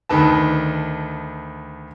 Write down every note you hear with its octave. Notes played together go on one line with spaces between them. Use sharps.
D2 D#3 B4 A5